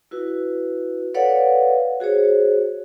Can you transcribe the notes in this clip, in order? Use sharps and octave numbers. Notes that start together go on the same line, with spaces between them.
E4 F#4 B4
A4 B4 C#5 D5 F5 F#5
F#4 G#4 C5 C#5